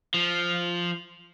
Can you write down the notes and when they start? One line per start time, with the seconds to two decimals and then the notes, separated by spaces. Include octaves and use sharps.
0.14 F3